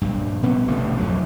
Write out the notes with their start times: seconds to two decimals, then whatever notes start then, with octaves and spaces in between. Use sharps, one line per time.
0.01 A#1 G2
0.43 C3 B3 C#4
0.68 A1 G2 B2 D3
0.98 F2 D3 F3 F#3